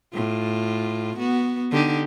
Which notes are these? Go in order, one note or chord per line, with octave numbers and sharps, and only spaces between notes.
A2 F4
B3 F#4
D3 D#4 G4